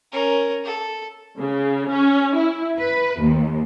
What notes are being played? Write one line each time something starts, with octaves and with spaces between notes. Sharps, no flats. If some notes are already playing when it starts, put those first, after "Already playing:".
C#4 A#4
A4
C#3
C#4
E4
B4
D#2